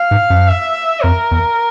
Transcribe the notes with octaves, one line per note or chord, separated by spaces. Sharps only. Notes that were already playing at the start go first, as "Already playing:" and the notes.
Already playing: F5
G#2
F#2
E5
F2 A#4
E2